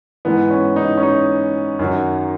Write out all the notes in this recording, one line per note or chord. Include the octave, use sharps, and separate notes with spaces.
G#2 E3 B3
C#4
D#4
C#4
D#4
F#2 D#3 F#3